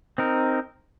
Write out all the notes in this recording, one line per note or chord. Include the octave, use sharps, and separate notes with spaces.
C4 D#4 A#4